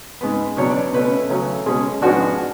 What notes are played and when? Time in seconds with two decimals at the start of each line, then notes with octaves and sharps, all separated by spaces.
0.21 G#2 G#3 B3 B4
0.57 B2 F#3 B3 D4 C#5
0.70 D5
0.93 B2 A3 C#4 B4
1.29 C#3 F#3 A3 C#4
1.66 B2 G#3 C#4 G#4
2.02 G#2 F3 G#3 B3 D4 F#4